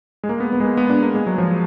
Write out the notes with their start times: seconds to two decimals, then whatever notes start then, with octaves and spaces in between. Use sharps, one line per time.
0.24 G#3
0.29 A#3
0.40 B3
0.53 B3
0.60 G#3
0.65 A#3
0.77 B3
0.90 D4
1.02 A#3
1.14 G#3
1.27 F#3
1.38 F3